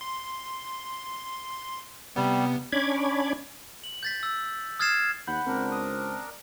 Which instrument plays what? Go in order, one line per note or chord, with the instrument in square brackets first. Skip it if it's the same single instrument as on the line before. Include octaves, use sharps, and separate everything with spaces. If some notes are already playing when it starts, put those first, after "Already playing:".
[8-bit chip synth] C6
[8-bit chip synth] C3 B3 [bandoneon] G3
[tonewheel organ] C#4 D4 C#5 B5 D6 G#6
[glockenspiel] F#7
G6 A6 B6
E6
D#6 F6 G#6 A6 C7 E7
[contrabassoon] D#2 [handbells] F#5 B5 G6 [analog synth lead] F#6
[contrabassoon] C#2 [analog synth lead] C4 [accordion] D4 A#4
[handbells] D#6